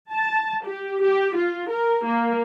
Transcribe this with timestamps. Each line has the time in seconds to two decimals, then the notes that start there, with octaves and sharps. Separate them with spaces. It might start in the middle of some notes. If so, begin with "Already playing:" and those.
0.11 A5
0.66 G4
1.02 G4
1.36 F4
1.69 A#4
2.05 A#3